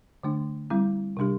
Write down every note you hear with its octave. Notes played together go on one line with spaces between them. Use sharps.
D3 A3 D4
G3 C4 E4
C3 G3 D4 G4